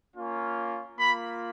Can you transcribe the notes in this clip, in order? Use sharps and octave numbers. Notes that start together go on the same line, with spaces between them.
A#3 C#4 F4
A#3 F4 B5